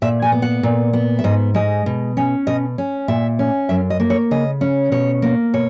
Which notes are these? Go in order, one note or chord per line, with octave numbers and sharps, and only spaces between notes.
A#2 E5
G#5
B3
F#5
A#2
B3
E5
G#2 D#5
G#3 D#5
B2
C#4
B2 D#5
C#4
A#2 E5
C#4
F#2 E5
D#5
A#3
C#5
C#3 D#5
C#4
B2 C#5
A#3
B2 C#5